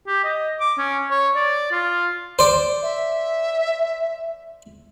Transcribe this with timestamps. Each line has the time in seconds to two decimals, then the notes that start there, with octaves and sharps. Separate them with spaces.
0.07 G4
0.24 D#5
0.60 D6
0.78 C#4
1.11 C#5
1.35 D5
1.72 F4
2.39 C5 D5
2.82 E5